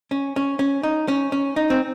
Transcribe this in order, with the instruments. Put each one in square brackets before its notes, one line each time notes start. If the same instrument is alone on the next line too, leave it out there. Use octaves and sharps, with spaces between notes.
[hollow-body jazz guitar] C#4
C#4
C#4
D#4
C#4
C#4
D#4
C4